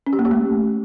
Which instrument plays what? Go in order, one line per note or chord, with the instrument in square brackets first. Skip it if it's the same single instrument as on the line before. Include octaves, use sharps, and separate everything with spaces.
[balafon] C#4
G4
A#3
G4
A3